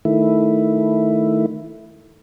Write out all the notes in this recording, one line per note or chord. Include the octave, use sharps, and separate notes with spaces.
D#3 A3 E4